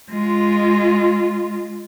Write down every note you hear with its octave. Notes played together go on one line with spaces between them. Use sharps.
G#3 F4